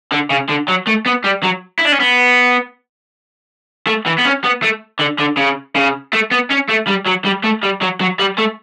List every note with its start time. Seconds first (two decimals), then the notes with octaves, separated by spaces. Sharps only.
0.12 D3
0.30 C#3
0.49 D3
0.68 F#3
0.87 A3
1.06 B3
1.24 G3
1.44 F#3
1.79 E4
1.85 D4
1.92 C#4
2.00 B3
3.87 A3
4.06 E3
4.18 B3
4.25 C#4
4.44 B3
4.63 A3
5.00 D3
5.19 D3
5.37 C#3
5.76 C#3
6.13 A3
6.31 B3
6.51 C#4
6.69 A3
6.88 G3
7.07 F#3
7.25 G3
7.44 A3
7.63 G3
7.82 F#3
8.01 F#3
8.19 G3
8.38 A3